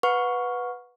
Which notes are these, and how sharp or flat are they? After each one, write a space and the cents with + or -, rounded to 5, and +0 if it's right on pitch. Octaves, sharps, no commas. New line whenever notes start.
B4 +0 F#5 -30 C#6 +0